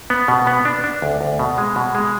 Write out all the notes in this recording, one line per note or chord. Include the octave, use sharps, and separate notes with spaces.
B3
B2
B3
D4
D4
D2
D2
B2
G#3
B2
G#3